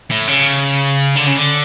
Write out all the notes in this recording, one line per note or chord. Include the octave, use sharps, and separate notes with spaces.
A2
C#3
D3
C#3
D3